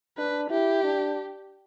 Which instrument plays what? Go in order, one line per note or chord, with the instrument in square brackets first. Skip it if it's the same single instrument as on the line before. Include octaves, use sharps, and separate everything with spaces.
[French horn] D4 [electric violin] B4
[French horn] E4 [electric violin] G4
[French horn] D4